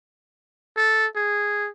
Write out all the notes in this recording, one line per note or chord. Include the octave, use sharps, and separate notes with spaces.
A4
G#4